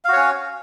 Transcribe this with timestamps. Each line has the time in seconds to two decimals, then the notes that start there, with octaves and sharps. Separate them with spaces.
0.05 F5
0.09 F#4
0.13 C#5
0.17 C#4